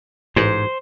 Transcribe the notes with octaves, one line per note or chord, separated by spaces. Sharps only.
A1 G#2 C5